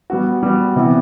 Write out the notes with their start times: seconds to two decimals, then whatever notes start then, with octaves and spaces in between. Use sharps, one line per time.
0.10 G3 B3 F#4
0.43 G3 B3 F#4
0.76 C3 E3 B3